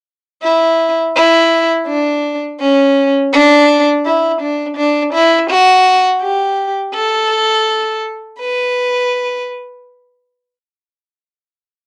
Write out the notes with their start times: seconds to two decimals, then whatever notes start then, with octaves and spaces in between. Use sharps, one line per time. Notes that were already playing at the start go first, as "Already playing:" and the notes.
0.43 E4
1.16 E4
1.88 D4
2.60 C#4
3.33 D4
4.06 E4
4.41 D4
4.77 D4
5.14 E4
5.50 F#4
6.22 G4
6.94 A4
8.40 B4